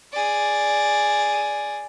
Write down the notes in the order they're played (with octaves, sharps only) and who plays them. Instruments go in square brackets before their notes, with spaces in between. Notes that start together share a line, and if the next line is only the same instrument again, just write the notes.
[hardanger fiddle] G#4 D5